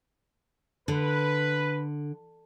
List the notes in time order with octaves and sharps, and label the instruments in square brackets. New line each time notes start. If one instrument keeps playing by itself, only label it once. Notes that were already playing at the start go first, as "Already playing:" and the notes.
[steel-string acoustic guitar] D3 [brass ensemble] B4